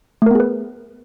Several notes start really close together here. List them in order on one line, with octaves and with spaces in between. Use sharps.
A3 A#4 B3 G#4 B4